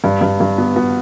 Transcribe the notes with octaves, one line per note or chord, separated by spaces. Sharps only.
G2
G2
G2
B3
B3